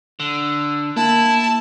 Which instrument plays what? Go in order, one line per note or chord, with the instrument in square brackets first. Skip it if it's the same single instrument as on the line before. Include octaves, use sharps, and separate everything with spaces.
[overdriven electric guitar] D3
[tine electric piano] A#3 [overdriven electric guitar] E4 [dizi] A5